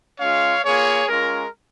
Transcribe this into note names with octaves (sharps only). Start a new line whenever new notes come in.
G#3 C#4 F4 C#5 F5
A#3 F4 G#4 C#5
G#3 C#4 F4 A#4